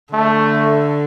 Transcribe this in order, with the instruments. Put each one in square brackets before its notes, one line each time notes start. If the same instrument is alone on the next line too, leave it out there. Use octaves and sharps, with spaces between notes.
[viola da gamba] D3 [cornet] A3